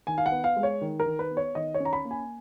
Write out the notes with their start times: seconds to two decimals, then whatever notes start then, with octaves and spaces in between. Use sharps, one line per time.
0.07 D#3 G#5
0.18 F5
0.26 F#5
0.32 B3
0.44 F5
0.56 G#3
0.63 C#5
0.81 D#3
1.00 A#4
1.06 D#3
1.19 B4
1.31 B3
1.37 C#5
1.55 D#3 D#5
1.74 C#5
1.80 C#4
1.85 A#5
1.93 B5
2.05 A#3
2.11 G#5